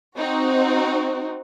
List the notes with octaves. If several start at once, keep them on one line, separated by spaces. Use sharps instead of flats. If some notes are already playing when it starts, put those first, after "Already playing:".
C4 D#4 F#4